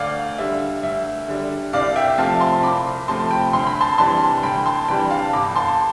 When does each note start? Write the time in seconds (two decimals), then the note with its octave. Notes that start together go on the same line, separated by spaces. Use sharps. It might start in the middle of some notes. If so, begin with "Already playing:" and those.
Already playing: D2 D5 F5
0.38 D3 G3 D4 E5
0.83 D2 E5
1.28 D3 G3 D4
1.73 C2 D5 F5
1.96 E5 G5
2.18 C3 F3 A3 C4 F5 A5
2.41 A5 C6
2.63 C2 B5 D6
3.08 C3 F3 A3 C4 A5 C6
3.31 G5 B5
3.53 D2 C6
3.67 B5
3.81 A5 C6
3.98 C3 E3 G3 D4 A5 C6
4.43 D2 G5 B5
4.66 A5 C6
4.88 C3 E3 G3 D4 G5 B5
5.10 F5 A5
5.33 G1 B5 D6
5.55 A5 C6